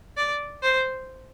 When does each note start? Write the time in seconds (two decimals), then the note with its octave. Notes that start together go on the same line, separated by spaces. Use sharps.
0.17 D5
0.62 C5